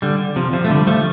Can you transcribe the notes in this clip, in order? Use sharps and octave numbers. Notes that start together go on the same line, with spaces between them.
D3 G3
C3 F3
C3 F3
A3
D3 G3
F3 A3